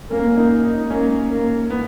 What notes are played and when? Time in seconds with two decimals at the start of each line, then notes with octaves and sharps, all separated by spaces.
0.10 A#3 C#4
0.26 C#4
0.37 D#4
0.64 D#4
0.90 A#3 C#4
1.30 A#3
1.70 B3